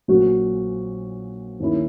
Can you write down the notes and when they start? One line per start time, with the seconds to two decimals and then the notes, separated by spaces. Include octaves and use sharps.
0.08 A#1 A#2 F#3 C#4 F#4
1.60 D#2 D#3 A#3 C#4 E4